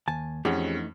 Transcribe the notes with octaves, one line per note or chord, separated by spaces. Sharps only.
D#2 G#5 A5
F2 E3 A3 C#4 D#4 G4 G#4 F#5